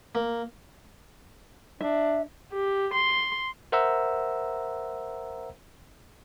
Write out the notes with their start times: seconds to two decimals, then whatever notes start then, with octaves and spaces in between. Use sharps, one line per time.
0.15 A#3
1.81 D4 E5
2.52 G4
2.94 C6
3.72 A#4 C5 E5 F#5 A#5 E6